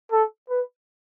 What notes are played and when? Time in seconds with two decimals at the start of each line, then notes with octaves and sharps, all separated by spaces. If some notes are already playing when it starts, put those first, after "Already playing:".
0.12 A4
0.50 B4